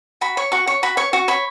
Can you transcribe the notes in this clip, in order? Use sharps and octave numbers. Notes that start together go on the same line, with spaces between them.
F#4 B5
C#5 C#6
F#4 C#6
C#5 C#6
F#4 B5
C#5 C#6
F#4 C#6
C#5 B5